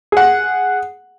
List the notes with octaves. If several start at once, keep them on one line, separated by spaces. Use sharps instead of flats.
G#4 F#5